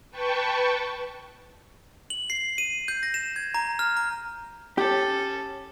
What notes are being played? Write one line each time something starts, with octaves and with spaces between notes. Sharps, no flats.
B4 G5 A5 C#6
F#7
C7
D#7
G6
A#6
E7
G#6
A#5
F6
A#5
C#4 G4 A4